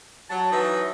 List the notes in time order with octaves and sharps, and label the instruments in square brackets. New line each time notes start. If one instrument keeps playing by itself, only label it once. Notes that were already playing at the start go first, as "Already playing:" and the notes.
[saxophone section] F#3 [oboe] A5
[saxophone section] E3 F#3 E5 [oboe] D#4